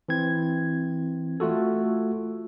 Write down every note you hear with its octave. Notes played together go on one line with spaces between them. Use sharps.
E3 C4 G#6
A3 F4 F#4 A4